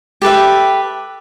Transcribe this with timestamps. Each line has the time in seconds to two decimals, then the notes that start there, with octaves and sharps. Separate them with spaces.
0.22 G4 A4 B4 E5